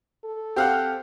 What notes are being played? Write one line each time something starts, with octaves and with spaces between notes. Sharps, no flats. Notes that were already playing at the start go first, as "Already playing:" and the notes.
A4
C4 G4 F5 F#5